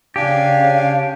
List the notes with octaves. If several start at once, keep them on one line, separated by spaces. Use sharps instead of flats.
C#3 D4 G4 C#5 F5 G#5